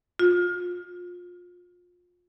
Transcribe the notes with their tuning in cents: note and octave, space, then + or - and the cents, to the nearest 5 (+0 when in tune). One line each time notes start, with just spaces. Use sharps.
F4 +25